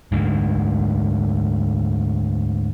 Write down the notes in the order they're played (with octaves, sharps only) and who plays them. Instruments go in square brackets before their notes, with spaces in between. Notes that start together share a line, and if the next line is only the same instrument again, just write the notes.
[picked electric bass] D2 G#2